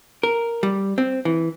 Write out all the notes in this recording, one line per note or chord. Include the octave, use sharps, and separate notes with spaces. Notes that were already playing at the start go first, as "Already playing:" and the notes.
A#4
G3
C4
E3